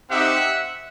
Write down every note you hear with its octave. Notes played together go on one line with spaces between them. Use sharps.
C4 D#4 G4 E5 F#5